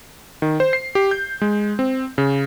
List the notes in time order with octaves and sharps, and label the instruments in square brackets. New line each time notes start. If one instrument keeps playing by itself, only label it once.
[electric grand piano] D#3
C5
C7
G4
G6
G#3
C4
C#3